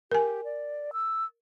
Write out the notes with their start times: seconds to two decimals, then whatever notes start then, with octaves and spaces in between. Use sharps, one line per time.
0.11 G4 A#4 G#5
0.44 D5
0.93 E6